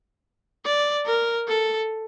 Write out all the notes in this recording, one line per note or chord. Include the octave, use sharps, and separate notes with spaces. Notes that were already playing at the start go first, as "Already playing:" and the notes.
D5
A#4
A4